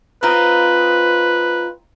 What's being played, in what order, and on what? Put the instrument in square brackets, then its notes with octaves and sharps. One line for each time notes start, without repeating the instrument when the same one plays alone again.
[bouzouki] C4 D#4 F4 [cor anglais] B4